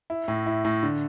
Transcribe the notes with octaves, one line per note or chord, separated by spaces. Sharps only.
E4
A2
E4
A2
D3